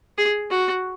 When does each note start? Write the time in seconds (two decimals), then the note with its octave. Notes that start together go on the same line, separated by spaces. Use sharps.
0.18 G#4
0.50 F#4